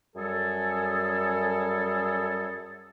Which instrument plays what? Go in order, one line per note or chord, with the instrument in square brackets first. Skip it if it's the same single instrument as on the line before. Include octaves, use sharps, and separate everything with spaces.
[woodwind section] F#2 G3 G#4 A4